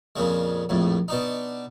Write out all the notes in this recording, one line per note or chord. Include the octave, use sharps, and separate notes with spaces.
F2 A#2 C#3 G#3
A#1 F2 A2
B2 D4 D#4